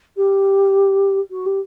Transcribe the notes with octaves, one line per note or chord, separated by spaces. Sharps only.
G4
F#4
G4